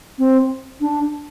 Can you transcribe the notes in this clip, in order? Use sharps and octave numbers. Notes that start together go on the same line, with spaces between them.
C4
D4